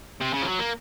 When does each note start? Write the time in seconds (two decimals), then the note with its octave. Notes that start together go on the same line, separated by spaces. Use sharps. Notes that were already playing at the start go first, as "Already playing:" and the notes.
0.21 C3
0.33 C#3
0.42 F3
0.47 F#3
0.59 A#3